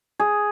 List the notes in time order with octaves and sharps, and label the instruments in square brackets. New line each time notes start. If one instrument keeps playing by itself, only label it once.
[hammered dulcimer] G#4